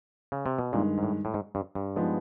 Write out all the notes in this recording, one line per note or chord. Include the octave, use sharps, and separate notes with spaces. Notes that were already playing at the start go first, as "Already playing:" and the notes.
C#3
C3
B2
G2 A#2 D#3 G#3
G#2
A2
A2
G#2
G2
G2
F3 G#3 B3 D#4